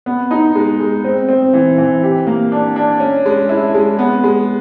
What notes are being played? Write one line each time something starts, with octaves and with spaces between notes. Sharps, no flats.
B3
D#4
G#3
G#3
C4
C4
E3
E3
G4
A#3
D4
D4
C#4
G#3
E4
G#3
B3
G#3